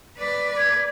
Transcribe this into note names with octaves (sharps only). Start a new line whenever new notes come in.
B4 D5
G#6